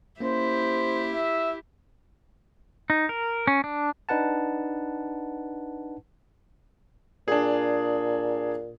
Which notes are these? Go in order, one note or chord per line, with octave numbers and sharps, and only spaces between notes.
A#3 C#4 E4 G4 C5
E5
D#4
A#4
C#4
D4
D4 D#4 B4 F#5 A5
A#2 D4 G#4